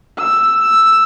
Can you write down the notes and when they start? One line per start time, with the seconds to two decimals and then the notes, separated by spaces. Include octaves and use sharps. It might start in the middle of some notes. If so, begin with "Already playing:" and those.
0.17 E6
0.61 E6